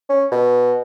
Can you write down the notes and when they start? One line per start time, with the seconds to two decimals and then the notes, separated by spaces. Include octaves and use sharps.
0.09 C#4
0.32 B2